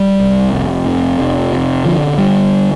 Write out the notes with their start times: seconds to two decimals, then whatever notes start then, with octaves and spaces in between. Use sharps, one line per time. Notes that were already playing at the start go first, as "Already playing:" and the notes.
Already playing: G3
0.20 C2
0.53 F1
0.86 F2
1.19 F1
1.52 C3
1.84 D3 F3
2.18 D3 G3